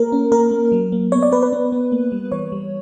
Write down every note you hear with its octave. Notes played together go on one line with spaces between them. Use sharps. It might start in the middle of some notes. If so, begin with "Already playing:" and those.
Already playing: A#3 A#4
C#4
A#3 A#4
A#3
F#3
A#3
B3 C#5
D5
B3 B4
B4
B3
B3
A#3
G3
E3 C#5
G3